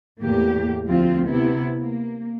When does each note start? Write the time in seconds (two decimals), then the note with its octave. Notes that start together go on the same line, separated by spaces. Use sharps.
0.20 E2 A2 A#3 G4
0.86 D2 F3 C4 F4
1.26 C3 B3 E4
1.79 A#3